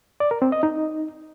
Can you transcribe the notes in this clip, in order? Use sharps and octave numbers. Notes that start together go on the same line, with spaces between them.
D5
A#4
C4
D#5
D#4